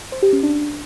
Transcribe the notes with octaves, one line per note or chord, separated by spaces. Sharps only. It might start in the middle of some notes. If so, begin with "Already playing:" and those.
C5
G4
C#4
D4